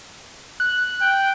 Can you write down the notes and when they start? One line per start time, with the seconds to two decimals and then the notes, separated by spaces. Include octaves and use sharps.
0.60 F#6
1.01 G5